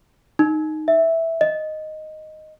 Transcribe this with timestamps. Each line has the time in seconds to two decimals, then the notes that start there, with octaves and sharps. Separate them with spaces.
0.39 D#4
0.88 E5
1.41 D#5